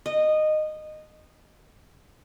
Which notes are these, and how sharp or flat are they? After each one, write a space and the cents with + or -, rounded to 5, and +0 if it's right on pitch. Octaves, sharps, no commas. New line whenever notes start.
D#5 -15